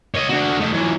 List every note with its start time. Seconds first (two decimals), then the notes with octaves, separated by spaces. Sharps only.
0.15 C#5 D#5
0.29 D4 F#4
0.60 A3 D#4
0.73 E3 F#3